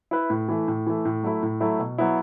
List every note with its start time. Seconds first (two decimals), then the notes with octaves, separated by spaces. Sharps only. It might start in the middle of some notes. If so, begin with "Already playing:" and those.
0.11 E4 B4 E5
0.30 A2
0.49 E3 A3
0.68 A2
0.87 E3 A3
1.05 A2
1.23 F#3 A3 E4
1.43 A2
1.60 F#3 A3 E4
1.79 B2
1.98 F#3 B3 E4